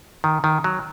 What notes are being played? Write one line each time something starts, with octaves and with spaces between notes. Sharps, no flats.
D#3
D#3
F#3